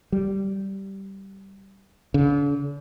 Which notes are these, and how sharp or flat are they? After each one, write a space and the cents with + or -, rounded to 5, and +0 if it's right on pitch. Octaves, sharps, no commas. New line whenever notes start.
G3 -10
D3 -45